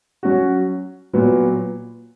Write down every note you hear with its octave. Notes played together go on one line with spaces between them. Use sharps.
F#3 C#4 F#4
A#2 F#3 B3